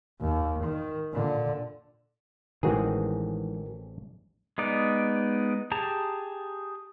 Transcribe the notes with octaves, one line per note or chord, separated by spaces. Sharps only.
D#2
D#3
A#2 D3
A1 D#3 E3 G#3 C4 F#4 G#4 A#4
G#3 B3 D#4 D5
G4 G#4 A5 A#5